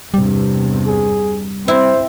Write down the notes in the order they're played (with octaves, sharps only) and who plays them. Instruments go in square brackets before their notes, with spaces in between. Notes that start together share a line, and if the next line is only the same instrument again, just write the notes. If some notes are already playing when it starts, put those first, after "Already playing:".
[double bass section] E2 G2 C3 [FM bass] G3
[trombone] G#4
[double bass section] C4 [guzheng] E4 [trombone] C5